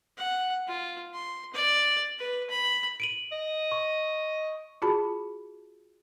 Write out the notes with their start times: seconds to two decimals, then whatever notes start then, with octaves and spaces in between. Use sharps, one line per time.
0.17 F#5
0.68 F4
1.14 C6
1.53 D5
2.19 B4
2.50 B5
3.00 D7 D#7 F#7
3.32 D#5
3.72 C#6
4.82 F4 F#4 G#4 A5 B5